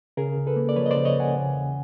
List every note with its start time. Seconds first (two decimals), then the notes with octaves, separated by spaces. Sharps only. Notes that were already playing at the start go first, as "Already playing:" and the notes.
0.17 C#3 G#4 A#4
0.37 C#2
0.47 A4 B4
0.56 A#3
0.69 D5
0.76 F3 B4 C#5
0.86 D#5
0.91 C5 D5
0.96 C#3
1.05 C#5 D#5
1.15 C#2 F#5 G#5
1.35 C#3
1.54 E2